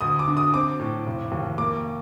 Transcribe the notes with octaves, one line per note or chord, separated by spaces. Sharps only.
D2 D#6
D6
D3
D#6
C4 D6
A2
F1
D#2
A#3 D6